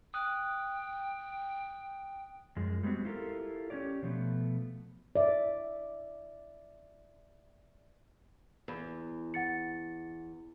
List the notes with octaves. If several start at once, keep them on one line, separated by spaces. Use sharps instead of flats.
G5 D#6 F#6
F#2 F3 G#3
G3 G#3 B3 C4 F#4
E4 F4 G4 A4 A#4
C#4 F4 G4 C#5 D5
B2 F3 A3 B3
D5 E5
E2
F#5 A6 C#7